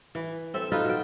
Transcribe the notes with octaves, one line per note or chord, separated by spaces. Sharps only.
E3
C4 A4 E5
D#4 F4 A4 B4
B2 F#4 G5